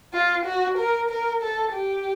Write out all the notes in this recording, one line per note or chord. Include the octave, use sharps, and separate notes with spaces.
F4
F#4
A#4
A#4
A4
G4